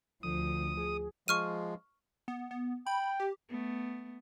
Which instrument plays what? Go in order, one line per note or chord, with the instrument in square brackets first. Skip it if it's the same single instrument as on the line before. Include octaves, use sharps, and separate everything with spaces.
[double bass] D2 F3 [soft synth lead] D3 [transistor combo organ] D#6
[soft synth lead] G#4
[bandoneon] F3 G#3 [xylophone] C#6 F6 D#7
[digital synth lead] B3
B3
[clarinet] G5 [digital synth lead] B5
[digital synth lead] G4
[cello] A3 B3